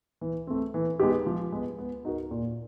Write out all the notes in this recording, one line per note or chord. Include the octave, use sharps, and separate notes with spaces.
E3
A3 C4
E3
G#3 B3 D#4 G4
F3
G#3 B3
B3
D#4 F#4 A#4
A#2